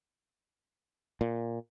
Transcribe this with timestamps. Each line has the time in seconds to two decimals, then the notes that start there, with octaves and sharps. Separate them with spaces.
1.21 A#2